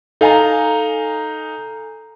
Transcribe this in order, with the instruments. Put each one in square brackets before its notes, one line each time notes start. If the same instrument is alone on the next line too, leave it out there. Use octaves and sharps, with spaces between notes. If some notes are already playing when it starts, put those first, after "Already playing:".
[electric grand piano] D#4 F5 [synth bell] A4 G#5 A#5